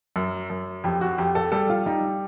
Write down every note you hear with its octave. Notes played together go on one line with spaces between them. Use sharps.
F#2
F#2
F2 G4
F#4
F2 G4
A4
G3 A4
F4
G3 D#4